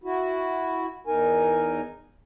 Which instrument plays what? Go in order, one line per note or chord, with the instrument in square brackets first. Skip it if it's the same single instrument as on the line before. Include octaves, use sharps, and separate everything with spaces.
[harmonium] E4 F#4
E2 D#4 A#4 G#5